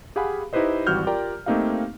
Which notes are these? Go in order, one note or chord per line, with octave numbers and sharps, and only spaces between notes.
G4 G#4 F5 F#5 G#5 B5
D#4 E4 G4 B4 C5 D#5
G#1 E3 G3 F#4 F6 G6
F4 G4 A#4 D5 G5 A#5
A3 A#3 C4 D#4 G4 F5